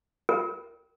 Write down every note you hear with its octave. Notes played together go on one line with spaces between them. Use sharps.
A#4